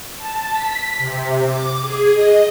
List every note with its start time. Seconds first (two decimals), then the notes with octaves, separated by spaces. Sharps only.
0.16 A5
0.52 B6
0.99 C3
1.45 D6
1.81 G#4
2.14 D#5